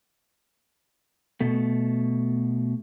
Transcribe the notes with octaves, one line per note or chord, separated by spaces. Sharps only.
B2 A3